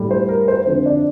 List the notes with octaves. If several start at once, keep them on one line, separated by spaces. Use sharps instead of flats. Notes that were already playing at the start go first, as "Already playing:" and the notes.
Already playing: A2 G3
C5
A#4
C5
F2 D3 F3 C5
D4 D5